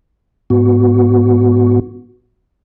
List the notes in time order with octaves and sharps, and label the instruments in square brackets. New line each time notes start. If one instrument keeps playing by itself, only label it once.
[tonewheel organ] G#2 B3 F#4